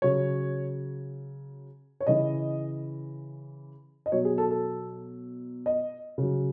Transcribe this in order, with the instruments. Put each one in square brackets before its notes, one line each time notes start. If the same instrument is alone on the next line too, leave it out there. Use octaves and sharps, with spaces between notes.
[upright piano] C#3 F#3 C#5
C#5
C#3 E3 D#5
D#5
B2 F#3 C#5
G#4
A4
A4
D#5
C#3 F#3